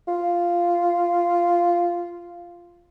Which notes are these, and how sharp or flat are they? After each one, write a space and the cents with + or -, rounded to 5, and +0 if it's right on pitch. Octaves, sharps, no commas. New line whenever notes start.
F4 -5